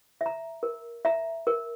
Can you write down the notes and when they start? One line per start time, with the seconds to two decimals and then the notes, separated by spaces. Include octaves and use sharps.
0.21 E5
0.26 A#5
0.63 A#4
1.05 E5 A#5
1.47 A#4